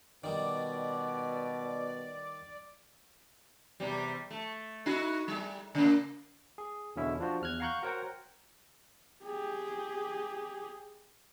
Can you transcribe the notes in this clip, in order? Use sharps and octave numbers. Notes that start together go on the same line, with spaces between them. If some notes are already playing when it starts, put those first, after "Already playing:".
B2 D#3 G3 D5
E2 C3 G3
A3
D#4 E4 F#4
G3
C#3 A#3
G#4
E2 B2 D3 C#4 E4 E5
F3 D4 F4 F#4 C5
E2 F6 F#6 G#6
F5 F#5 A#5 C#6 F#6 G6
F#4 A#4 C5 C#5 F#5 G5
G4 G#4